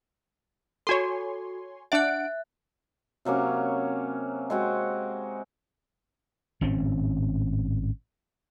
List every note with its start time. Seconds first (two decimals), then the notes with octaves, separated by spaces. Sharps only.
0.87 F#4 A4 C#5 G#5 C6
1.92 D4 E5 F#5 F#6 D7
3.25 C3 F#3 A#3 C#4
4.50 G#3 C4 F#4
6.61 G#1 A2 C4 C#4